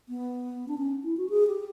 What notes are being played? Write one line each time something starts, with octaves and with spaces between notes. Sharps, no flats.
B3
D4
C#4
E4
F#4
G#4
G4